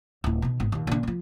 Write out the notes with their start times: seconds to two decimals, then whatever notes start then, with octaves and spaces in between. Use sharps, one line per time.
0.24 D1 E4
0.42 B2 D#3
0.60 G#1 B3
0.72 D#2 A#2
0.87 A#2 D3
1.03 D3 F3